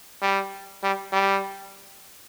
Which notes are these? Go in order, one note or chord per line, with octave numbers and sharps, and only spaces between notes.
G3
G3
G3